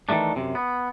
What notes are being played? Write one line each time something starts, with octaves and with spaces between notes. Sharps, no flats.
D#3 E3 G#3 A3 D4
F#2 C3
B3